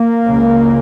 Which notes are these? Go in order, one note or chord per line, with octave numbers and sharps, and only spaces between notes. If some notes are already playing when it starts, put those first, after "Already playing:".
Already playing: A#3
C#2 C#3